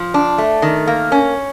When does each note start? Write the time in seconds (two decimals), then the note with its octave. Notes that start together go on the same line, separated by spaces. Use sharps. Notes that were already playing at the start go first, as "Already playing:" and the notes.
Already playing: F3
0.14 D4
0.38 A3
0.62 D#3
0.87 A#3
1.12 C#4